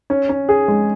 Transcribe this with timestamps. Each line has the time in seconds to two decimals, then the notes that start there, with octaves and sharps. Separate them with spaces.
0.10 C#4
0.29 C#4
0.49 G#4
0.68 G#3